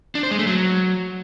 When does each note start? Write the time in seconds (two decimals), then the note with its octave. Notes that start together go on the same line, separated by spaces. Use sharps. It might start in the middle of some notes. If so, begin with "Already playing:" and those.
0.15 D4
0.23 C5
0.31 G#3
0.39 A3
0.47 F#3